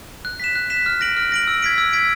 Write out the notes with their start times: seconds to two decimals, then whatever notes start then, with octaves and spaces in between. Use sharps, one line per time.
0.25 F#6
0.40 B6 E7
0.55 F#6
0.70 B6 E7
0.86 F6
1.01 A#6 D7 F#7
1.17 F6
1.32 A#6 D7 F#7
1.47 E6
1.62 G#6 B6 D7
1.78 E6
1.93 G#6 B6 D7